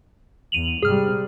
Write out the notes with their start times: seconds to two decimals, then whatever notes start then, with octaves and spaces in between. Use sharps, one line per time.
0.52 E2 D#7 F7 F#7
0.82 G#2 C3 G3 G#4 F6